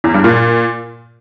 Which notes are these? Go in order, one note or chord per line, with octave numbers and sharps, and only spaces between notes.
E2
G2
A#2